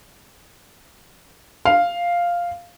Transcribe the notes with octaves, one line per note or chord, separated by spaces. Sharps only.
F5